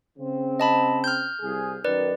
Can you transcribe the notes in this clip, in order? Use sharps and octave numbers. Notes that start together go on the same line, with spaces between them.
C#3 C4
D#5 A5 B5
F6 G6
C2 G#4
F#2 D#3 B4 D5